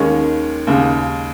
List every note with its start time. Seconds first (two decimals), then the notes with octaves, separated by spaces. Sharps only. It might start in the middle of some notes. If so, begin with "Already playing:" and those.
Already playing: D#2 D#3 G#3 C#4
0.67 D#2 C#3 G#3